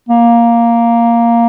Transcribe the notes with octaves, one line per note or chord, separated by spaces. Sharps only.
A#3